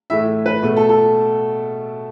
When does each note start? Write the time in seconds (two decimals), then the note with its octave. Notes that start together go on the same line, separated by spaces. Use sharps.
0.10 A2 E3 A3 E5
0.46 B4
0.63 B2 A3
0.77 A4
0.89 A4